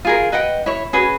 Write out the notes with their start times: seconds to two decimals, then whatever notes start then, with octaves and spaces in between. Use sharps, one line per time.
0.05 F4 G#4 A#4
0.32 B4 D#5 F#5 G5
0.66 E4 C#5
0.93 C#4 F#4 G#4 B4